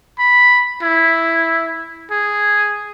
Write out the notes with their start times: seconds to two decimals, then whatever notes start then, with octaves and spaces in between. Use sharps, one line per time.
0.19 B5
0.83 E4
2.11 G#4